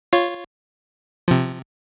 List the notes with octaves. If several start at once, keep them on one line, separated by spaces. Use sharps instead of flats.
F4 C#5
C3 F3